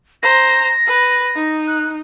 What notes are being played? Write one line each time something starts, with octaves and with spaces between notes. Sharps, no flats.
C5 A#5 A#6
B4
D#4
F#6